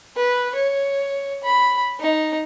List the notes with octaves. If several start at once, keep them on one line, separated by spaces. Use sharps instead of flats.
B4
C#5
B5
D#4